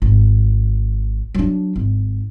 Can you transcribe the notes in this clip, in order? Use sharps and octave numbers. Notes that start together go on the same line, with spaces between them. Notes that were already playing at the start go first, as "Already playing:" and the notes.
G#1
F#3 D4
G#1